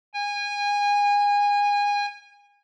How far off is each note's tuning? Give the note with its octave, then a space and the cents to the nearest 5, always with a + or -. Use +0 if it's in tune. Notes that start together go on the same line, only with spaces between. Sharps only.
G#5 -25